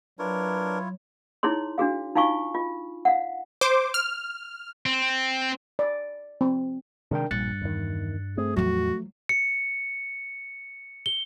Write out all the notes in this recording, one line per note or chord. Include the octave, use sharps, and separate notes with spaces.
F#3 D4 E4 F4 A#4 B4 C#5
D#4 E4 G#4 C#5 C6
D4 F#4 G#4 F5
D#4 F4 F5 G#5 C#6
F4
F5 F#5
C5 D6
F6
C4
D5
C4
C3 D#3 G#3 D4 A#4 G5
A#1 G2 A#2 F#6 A6 C#7
E2 D#3
A3 C4 G#4
E2 A2 F3 F#3 F#4
C#7
G7